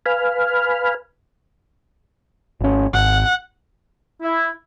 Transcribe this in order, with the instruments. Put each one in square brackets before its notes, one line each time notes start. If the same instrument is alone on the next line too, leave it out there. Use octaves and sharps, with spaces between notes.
[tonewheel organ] B4 F5 G#5 B5 F6
[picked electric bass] G#1 C#4
[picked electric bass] G#1 [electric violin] F#5
[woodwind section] E4